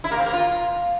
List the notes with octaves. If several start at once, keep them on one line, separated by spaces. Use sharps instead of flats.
E4
A#3
C4
A#3
F4